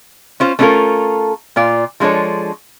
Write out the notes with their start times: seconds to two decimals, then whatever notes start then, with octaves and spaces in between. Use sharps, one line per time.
0.40 C#4 F4 C5
0.59 A3 C#4 D4 F4 A4 A#4
1.56 A#2 F4 D5
2.00 F3 G#3 D4 A4 C#5